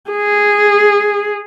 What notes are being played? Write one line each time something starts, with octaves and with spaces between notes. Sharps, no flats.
G#4